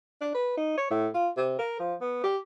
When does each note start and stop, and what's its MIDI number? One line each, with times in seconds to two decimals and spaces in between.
0.21 0.31 62
0.34 0.57 71
0.57 0.74 63
0.77 0.87 73
0.90 1.08 45
1.14 1.29 65
1.36 1.56 48
1.58 1.79 70
1.79 1.94 53
2.01 2.21 59
2.23 2.37 67